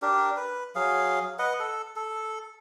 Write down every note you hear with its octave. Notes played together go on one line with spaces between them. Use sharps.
D4 G4 A#4
B4
F#3 G#4 F5
B4 D#5 F#5
A4
A4